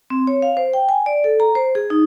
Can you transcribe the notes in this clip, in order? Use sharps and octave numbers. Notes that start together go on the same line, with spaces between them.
C4
C#5
F5
C5
G5
G#5
D5
A4
A#5
C5
G#4
D#4